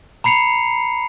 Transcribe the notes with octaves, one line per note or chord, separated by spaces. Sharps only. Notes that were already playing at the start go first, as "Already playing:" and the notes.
A#5 B5 C7 C#7 F7